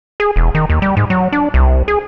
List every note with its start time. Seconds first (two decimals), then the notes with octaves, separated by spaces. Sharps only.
0.20 G#4
0.36 E1
0.55 D#3
0.70 D#2
0.82 G3
0.97 G#2
1.10 F#3
1.32 D4
1.54 C2
1.88 G#4